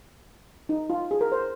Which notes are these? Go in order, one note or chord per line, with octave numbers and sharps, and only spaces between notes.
D#4
F4
G#4
A#4
C5